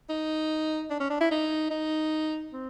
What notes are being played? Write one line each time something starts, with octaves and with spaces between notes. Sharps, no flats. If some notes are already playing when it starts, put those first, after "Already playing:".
D#4
D4
C#4
D4
E4
D#4
D#4
C4